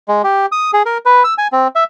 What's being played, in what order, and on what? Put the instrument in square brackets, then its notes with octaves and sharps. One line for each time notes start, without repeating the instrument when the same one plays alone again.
[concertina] G#3
G4
D#6
G#4
A#4
B4
E6
G#5
C4
E5